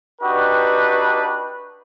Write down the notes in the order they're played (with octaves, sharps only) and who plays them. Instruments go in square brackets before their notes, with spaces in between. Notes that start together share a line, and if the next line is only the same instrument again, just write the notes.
[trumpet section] D4 D#4 F#4 G4 B4